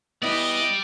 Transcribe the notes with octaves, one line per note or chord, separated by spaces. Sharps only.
B3 E4 G4 D5 D#5